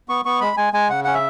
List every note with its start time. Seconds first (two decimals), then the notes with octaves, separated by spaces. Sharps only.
0.09 B3 C#6
0.25 B3 C#6
0.41 G#3 B5
0.57 G#3 G#5
0.73 G#3 G#5
0.90 C#3 F#5
1.04 C#4 F#5
1.14 E5